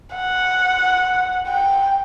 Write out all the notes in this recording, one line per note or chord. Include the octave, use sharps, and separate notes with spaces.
F#5
G5